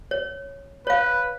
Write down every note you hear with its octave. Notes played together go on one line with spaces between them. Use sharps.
C#5
B4 C#5 F5